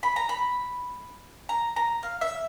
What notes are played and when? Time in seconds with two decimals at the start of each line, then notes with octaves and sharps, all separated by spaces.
0.03 B5
0.16 A#5
0.29 B5
1.49 A#5
1.76 A#5
2.03 F5
2.21 E5